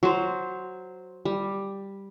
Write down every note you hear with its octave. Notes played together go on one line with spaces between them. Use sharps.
F#3 C5
G3